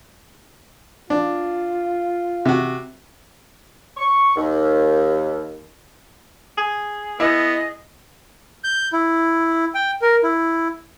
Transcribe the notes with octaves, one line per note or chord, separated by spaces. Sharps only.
D4 F4
C3 F#4
C#6
D#2
G#4
B3 E4 D#5
G6
E4
G5
A#4
E4